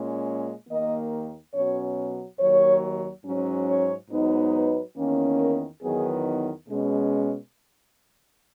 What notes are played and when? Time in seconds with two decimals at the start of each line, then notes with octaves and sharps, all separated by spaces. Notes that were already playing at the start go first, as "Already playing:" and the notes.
Already playing: A#2 G#3 C#4
0.68 D#2 D#3 A#3 D#5
1.54 B2 F#3 C#4 C#5
2.39 D#2 D#3 F#3 C#5
3.25 G#2 F#3 C#4
3.68 C#5
4.10 G#2 F#3 B3 D#4
4.53 B4
4.97 E2 D#3 A#3 C#4
5.40 A#4
5.83 E2 D#3 F#3 B3 D#4 G#4
6.68 B2 G#3 C#4